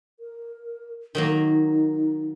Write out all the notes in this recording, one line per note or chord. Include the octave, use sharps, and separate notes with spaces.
A#4
D#3 F#3 A#3 D#4